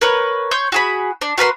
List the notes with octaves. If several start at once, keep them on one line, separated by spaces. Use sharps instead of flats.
A#4 B4 C#5
C#5 C6 G6
F#4 G#4 B5
D4
F#4 A#4 B4 C6